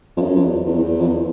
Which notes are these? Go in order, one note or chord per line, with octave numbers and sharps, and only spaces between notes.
F2
F#2
F2
E2
E2
F2
E2
F2
E2